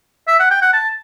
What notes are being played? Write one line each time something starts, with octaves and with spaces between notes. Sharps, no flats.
E5
F#5
G5
F#5
A5